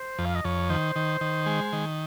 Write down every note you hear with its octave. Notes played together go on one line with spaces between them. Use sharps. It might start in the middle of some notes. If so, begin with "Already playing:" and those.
Already playing: C5
F2
F5
D#5
F2 C#5
D#3 C5
D#3
D#3
G#3
D#3